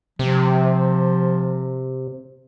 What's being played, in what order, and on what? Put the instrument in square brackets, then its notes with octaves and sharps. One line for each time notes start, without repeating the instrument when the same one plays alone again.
[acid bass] C3 [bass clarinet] F3